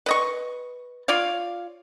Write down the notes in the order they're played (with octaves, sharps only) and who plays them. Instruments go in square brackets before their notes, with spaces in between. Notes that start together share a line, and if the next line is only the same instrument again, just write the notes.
[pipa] B4 D#5 C#6
F4 C#5 D5 F5